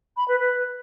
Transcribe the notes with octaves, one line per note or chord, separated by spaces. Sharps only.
B5
B4
B4